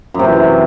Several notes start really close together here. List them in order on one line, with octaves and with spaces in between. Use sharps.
F#2 C3 E3